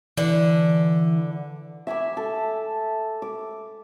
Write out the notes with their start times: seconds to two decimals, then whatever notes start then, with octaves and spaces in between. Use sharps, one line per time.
0.18 D3 E3
1.87 E5 G#5 B5 D6
2.17 A4
3.22 D6